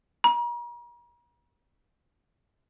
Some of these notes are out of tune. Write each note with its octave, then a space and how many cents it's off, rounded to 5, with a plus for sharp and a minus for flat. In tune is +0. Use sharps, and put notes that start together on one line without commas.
A#5 +40